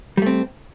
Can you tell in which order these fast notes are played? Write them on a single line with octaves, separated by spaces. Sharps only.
G3 A3 C4